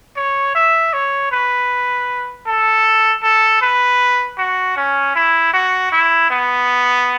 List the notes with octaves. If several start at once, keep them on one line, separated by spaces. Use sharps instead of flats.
C#5
E5
C#5
B4
A4
A4
B4
F#4
C#4
E4
F#4
E4
B3